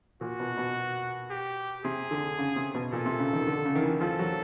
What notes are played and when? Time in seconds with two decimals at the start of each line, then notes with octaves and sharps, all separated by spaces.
0.21 A#2 F#4
0.40 B2
0.58 B2
1.30 G4
1.85 C3 G#4
2.11 D3
2.39 C#3
2.56 C3
2.75 B2
2.92 A#2 A4
3.06 C3
3.20 C#3
3.33 D#3
3.47 D3
3.65 C#3
3.75 D#3
3.83 E3
4.01 F3 A4
4.19 F#3